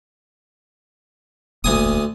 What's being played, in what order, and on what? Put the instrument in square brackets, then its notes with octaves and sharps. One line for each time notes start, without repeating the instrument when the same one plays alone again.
[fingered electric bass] E1 A1 A#3 [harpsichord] D2 G#5 D#6